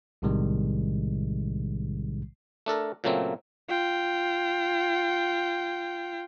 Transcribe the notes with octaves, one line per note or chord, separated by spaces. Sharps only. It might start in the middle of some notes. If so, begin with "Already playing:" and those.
B1 A2 C3 D#3 G3 G#3
A3 D4 A4 A#4
A#2 C#3 F#3 A3 A#3 C4
F4 G5